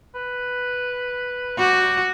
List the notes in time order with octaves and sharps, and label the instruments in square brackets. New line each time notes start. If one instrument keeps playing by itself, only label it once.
[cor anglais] B4
[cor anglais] G3 [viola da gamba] F#4